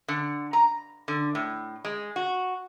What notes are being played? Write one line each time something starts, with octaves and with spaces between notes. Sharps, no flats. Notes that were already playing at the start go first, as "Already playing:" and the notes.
D3
A#5
D3
A2
G#3
F#4